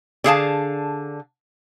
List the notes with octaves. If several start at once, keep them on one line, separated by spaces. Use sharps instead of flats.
D3 G#4 F5 A5